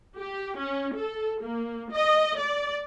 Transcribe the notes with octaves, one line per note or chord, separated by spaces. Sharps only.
G4
C#4
A4
A#3
D#5
D5